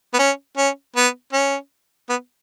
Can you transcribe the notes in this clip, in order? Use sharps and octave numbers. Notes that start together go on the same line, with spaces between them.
B3
C#4
C#4
B3
C#4
B3